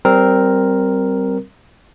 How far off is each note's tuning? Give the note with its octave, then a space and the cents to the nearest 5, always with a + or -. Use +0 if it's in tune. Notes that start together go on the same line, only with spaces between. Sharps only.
G3 -20 C4 +0 A#4 +0